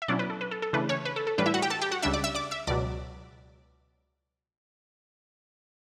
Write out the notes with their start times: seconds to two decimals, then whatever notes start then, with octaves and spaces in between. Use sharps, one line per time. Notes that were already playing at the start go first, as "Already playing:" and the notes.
0.02 E5
0.08 B2 F#3 C#4 D4 E4 D5
0.19 B4
0.30 A4
0.41 B4
0.51 A4
0.62 A4
0.73 C#3 E3 A3 D4 B4
0.89 C#4 C#5
1.05 B4
1.16 A4
1.27 A4
1.38 A2 E3 G3 D4 B4
1.46 E4 E5
1.54 F#4 F#5
1.62 G4 G5
1.70 A4 A5
1.81 G4 G5
1.91 F#4 F#5
2.02 C#2 C#3 G3 D4 E5 E6
2.13 D5 D6
2.24 E5 E6
2.35 D5 D6
2.51 E5 E6
2.67 C#2 B2 F#3 D5 D6